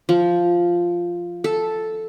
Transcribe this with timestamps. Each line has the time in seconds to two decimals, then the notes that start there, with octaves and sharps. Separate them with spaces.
0.09 F3
1.44 A4